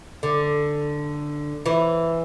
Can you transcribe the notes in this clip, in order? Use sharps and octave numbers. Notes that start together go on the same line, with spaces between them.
D3
E3